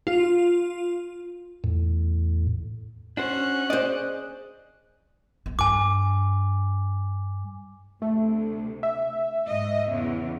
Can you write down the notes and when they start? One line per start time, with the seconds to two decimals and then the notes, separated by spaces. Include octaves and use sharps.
0.07 F4
1.64 E2 A2
3.17 C#4 D4 F#4 C5 F#6
3.70 G#4 C5 D5 D#5
5.46 B3
5.59 G2 G#5 D6
8.02 D2 C3 A3
8.83 E5
9.47 G#2 D#5
9.89 E2 C#3